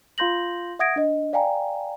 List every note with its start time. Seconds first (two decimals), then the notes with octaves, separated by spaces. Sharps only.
0.18 F4 F5 C6 G6 A#6 F#7
0.79 E5 F#5 D#6 G#6 A#6 D7
0.96 D4 D#5
1.33 D5 F5 G5 G#5 A#5